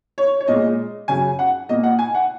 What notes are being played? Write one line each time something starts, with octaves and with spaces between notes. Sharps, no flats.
C#5
C#5
A#2 G#3 D#5
F#2 C#3 F#3 G#5
F#5
A#2 A#3 D#5
F#5
G#5
F#5